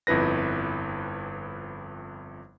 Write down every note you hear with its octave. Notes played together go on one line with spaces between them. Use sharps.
G1 F2 E4 B4 A#6